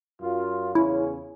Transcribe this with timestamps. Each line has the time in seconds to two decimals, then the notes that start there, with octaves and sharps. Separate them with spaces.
0.22 F#2 F4
0.75 E2 C#3 C#4 E4